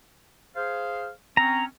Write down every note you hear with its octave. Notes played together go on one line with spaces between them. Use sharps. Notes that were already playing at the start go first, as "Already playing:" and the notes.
G#4 C5 F5
C4 C#4 A#5